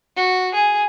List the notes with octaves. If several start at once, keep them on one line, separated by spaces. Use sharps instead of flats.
F#4
G#4